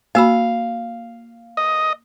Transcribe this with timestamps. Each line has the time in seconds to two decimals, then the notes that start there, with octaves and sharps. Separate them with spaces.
0.15 A#3 F#4 F5 B5
1.57 D#5